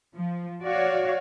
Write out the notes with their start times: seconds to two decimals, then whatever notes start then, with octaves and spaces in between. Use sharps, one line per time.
0.15 F3
0.64 F#4 C#5 D5 F5